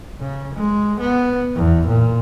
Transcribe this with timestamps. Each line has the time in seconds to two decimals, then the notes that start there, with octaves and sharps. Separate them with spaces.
0.21 C#3
0.55 G#3
1.00 B3
1.56 E2
1.88 A#2